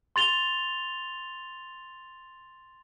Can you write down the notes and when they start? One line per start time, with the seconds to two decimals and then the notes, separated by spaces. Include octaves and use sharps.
0.16 C6 A6 F7 G7